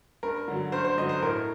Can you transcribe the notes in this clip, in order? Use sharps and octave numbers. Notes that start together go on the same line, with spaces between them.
G2 A#4
D3 F#3
G2 C5
C5
D3 F#3 D#5
C5
A2 A#4